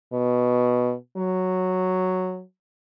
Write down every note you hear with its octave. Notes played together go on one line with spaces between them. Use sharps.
B2
F#3